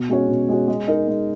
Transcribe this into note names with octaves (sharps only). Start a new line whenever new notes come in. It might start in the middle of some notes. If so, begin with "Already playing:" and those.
Already playing: B2
G#3 C#4 F#4 C#5
B2
G#3 C#4 F#4 C#5
G#3
D#4 A#4
G#3